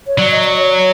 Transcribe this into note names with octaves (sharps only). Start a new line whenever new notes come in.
C#5
F#3 D5
D#5
D5
C#5